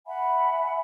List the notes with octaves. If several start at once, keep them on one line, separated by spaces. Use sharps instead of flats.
E5 F#5 G#5 B5